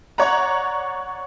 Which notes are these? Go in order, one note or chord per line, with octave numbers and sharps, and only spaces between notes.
C#5 D5 F#5 A#5